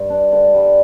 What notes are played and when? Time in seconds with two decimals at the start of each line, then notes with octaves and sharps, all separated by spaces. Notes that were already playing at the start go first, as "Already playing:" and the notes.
Already playing: G2
0.10 D4
0.32 D3
0.54 G3